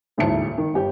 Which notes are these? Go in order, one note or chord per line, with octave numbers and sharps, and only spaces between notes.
D#1 A1 D2 G#2 A5 C#7
D#3
G1 G4